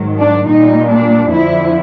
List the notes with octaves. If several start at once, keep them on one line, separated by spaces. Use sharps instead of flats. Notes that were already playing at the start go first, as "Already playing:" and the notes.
Already playing: G#2 D#3 F#3
D4
A#2 G3 D#4
D4
F2 D3 F3 E4